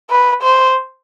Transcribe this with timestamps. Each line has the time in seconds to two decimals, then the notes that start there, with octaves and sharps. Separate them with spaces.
0.10 B4
0.43 C5